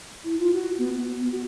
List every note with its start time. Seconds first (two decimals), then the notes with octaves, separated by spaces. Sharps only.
0.25 E4
0.39 F4
0.53 F#4
0.78 B3
0.95 B3
1.31 F#4